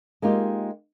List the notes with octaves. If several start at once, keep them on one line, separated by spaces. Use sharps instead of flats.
G#3 A#3 D#4 F4 G4